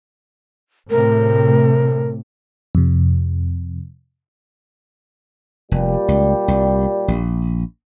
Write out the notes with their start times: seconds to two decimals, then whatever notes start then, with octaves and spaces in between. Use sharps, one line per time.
0.90 A2 C3 A#4
2.75 F2 C3
5.71 F1 A#2 G3
6.08 C#2
6.48 C2
7.08 A#1